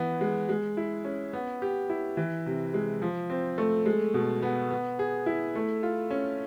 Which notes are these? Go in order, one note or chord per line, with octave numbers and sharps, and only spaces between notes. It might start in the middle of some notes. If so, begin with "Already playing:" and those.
Already playing: E3 B3
G#3
G#3
E4
C#4
B3
G4
E4
E3
C3
G#3
F3
C4
A3
G#3
B2
B3
B3
G#4
E4
A3
F4
C#4